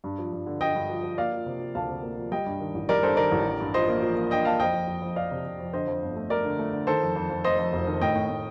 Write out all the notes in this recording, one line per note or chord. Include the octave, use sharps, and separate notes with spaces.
G2
F3
G2
D3
D3 D#5 G5
G2
F3
F3
A#3 D5 F5
F3
C3
F3
D2 F5 A5
C3
A#3
F3
G3 D#5 G5
G2
D#3
A1
G3 A#4 D5
G2 A4 C5
D#3 A#4 D5
A1
D4
G2
F3 C5 D#5
A#3
F3
A#3
D4 D#5 G5
A#3 F5 A5
F2 D#5 G5
F2
F2
F2
F2 D5 F5
C3
C3
F2
D3 C5 D#5
F2
G1
A3
A3 A#4 D5
D3
A3
D3
D#3 A4 C5
F2
F2
F2
F1 C5 D#5
F2
F1
D#3
A2 D#5 G5
A2
A2